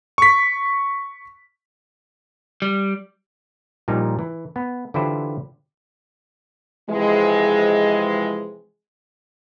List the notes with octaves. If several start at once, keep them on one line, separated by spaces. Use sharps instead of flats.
C#6 B6
G3
A#2 F3 G3 D#4
E3
B3
D3 E3 E4 F4 G4 C5
C3 E3 F3 G#3